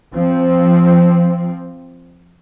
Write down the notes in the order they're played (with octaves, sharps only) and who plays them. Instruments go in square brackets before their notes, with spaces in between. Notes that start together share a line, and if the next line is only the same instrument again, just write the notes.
[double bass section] F3 C4